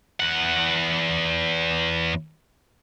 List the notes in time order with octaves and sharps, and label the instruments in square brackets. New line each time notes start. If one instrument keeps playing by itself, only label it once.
[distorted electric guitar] E2 F#5